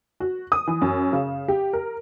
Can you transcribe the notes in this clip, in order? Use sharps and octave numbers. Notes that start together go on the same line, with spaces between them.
F#4
D#6
E3
F#2
C#3
G4
A#4